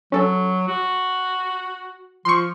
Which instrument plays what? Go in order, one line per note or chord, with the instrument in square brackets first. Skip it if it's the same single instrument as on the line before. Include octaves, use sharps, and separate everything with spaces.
[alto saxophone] F#3 [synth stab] C#4 A4
[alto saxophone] F#4
[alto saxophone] F3 [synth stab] C6 C#6